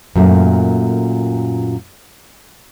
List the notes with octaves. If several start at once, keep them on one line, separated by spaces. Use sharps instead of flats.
F#2 A#2 A3